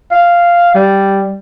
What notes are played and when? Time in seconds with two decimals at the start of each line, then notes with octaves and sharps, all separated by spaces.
0.11 F5
0.75 G3